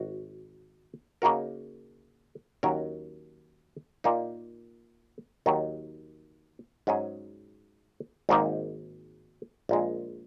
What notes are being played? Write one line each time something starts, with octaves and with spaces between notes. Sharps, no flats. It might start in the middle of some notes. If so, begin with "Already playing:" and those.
Already playing: G#1 F#4
C#3 A#3 D#4 F#4 A#4
D#2 D#3 F#3 C#4 A#4
A#2 A#3 D#4
D#2 D#3 F#3
G#2 F#3 C#4 G#4
G#1 G#2 D#3 A#3 D#4
A#1 A#2 G#3